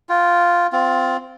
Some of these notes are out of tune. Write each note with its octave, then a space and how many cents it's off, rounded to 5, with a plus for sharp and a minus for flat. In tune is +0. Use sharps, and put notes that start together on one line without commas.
F4 +0 G5 -25
C4 -15 F4 +5